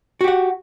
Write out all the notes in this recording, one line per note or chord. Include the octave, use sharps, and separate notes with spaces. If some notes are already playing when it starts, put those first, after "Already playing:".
F#4 G4 F#5